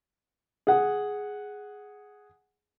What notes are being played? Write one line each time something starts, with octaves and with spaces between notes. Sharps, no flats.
G#4 F#5